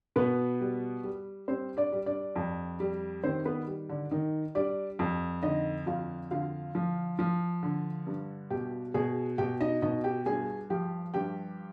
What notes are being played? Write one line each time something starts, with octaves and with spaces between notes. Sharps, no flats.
B2 B3 B4
G3
G3
G3 C4 C5
D4 D5
G3
D4 D5
F2
G3
D#3 C4 C5
B3 B4
G3
D3 D4
D#3 D#4
G3 D4 D5
F2
D3 D#4 D#5
F2 F4 F5
D3 F4 F5
F3
F3
D3
G2
B2 G4 G5
B2 G#4 G#5
B2 G4 G5
D#4 D#5
B2 D#4 D#5
G4 G5
G2 G#4 G#5
F3 G4 G5
G2 G4 G5